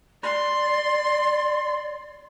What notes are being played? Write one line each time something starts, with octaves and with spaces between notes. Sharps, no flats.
D5 C6